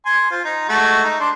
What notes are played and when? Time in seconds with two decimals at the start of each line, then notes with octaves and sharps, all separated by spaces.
0.05 G#5 C6
0.30 F4 C5
0.45 D#4
0.69 G#3 A3 F#4
1.04 D#4
1.20 D4 C6